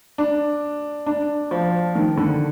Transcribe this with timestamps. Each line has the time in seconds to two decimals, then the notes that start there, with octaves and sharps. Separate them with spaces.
0.18 D4
1.06 D4
1.51 F3
1.95 D#3
2.17 D3